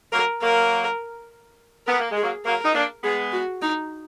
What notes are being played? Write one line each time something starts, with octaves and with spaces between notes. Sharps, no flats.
F#3 A#3 A#4
F#3 A#3 A#4
B3 A#4
A#3
G#3
G#4
F#3 A#3
F#3 A#3 A#4
D#4
A#3 D4
G#3 B3 G#4
F#4
D#4